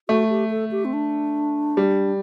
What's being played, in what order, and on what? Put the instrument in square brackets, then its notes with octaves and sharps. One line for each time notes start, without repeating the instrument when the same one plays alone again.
[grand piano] A3 [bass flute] F#4
[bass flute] G4
A4
G4
C4
D4
[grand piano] G3